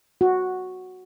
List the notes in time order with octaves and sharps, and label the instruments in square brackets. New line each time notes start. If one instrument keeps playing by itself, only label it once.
[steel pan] F#4